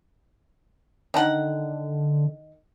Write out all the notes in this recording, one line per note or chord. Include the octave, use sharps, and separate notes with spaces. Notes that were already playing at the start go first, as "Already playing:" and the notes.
D3 D#3 F#5